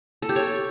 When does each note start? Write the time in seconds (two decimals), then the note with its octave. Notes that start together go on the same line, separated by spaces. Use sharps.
0.22 A4
0.29 G4
0.36 C#5